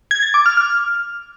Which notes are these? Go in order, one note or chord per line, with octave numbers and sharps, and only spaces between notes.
G#6
A6
D6
F6
F6